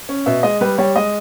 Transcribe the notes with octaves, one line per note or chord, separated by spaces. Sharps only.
C#4
B2 E5
G#3 D#5
G3 B4
G3 C#5
G#3 D#5